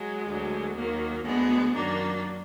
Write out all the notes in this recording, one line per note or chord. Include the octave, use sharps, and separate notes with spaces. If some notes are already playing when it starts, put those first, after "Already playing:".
Already playing: F#3 G#3
D2 D3 F#3
D#2 D#3 F#3 A#3
D2 D3 F#3 G#3 B3
F#2 D#3 F#3 A#3 D4